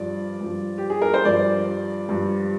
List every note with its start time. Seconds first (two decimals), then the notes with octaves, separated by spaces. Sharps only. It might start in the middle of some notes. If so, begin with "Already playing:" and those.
Already playing: G2 F3 D5
0.41 G2 F3
0.78 G4
0.90 G#4
1.02 A#4
1.14 C5
1.25 G2 F3 D5
2.09 G2 F3